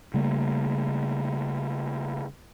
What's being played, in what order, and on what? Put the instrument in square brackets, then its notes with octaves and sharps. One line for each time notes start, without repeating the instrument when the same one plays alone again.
[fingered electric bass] C#3 G3 A3 A#3